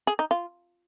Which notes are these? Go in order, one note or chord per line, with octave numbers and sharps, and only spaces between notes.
G#4
D#4
F4